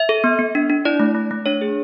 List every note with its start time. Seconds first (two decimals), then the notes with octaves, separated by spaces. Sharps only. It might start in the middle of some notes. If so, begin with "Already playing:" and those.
Already playing: E5
0.09 A4
0.24 B3
0.39 B3
0.55 D4
0.70 D4
0.85 E4 D5
1.00 A3
1.15 A3
1.31 A3
1.46 D4 C#5
1.61 G#4